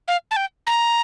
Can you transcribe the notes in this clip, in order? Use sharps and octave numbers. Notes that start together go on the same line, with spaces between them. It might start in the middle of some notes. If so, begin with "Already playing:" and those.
F5
A5
G5
A#5